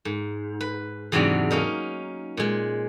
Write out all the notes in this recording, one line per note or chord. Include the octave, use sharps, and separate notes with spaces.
G#2
B4
E2 G#2 C3 F#3 C4 D4
A#3 C#4 D#4 A#4
A#2 G#3